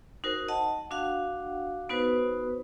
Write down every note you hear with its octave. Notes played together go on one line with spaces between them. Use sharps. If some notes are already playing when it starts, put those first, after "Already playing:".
D#4 F#4 A#4 C5
D#5 F#5 A5
D4 F#4 F5 F#5
B3 D#4 F#4 B4 C5